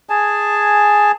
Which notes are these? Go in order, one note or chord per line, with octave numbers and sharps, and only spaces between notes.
G#4 G#5 A5